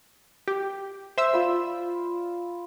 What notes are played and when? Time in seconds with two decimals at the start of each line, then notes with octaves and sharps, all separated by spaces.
0.48 G4
1.18 C5 E5 E6
1.33 F4 D5 B5